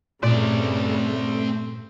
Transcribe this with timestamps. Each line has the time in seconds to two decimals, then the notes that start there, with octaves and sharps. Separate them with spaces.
0.23 G2 A#2 C#3 A3 C4 D5